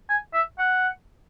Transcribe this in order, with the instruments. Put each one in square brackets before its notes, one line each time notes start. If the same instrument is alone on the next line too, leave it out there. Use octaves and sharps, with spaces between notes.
[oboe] G#5
E5
F#5